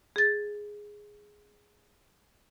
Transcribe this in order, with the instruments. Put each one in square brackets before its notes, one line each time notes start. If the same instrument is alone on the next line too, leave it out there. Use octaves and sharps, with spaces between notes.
[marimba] G#4 A6